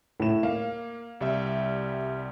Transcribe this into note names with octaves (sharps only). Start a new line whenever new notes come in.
A2 E7
A#3 F5
C2 G3 E5